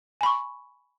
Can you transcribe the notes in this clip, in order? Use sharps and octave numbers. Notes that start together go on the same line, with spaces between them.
G#5 B5 C#6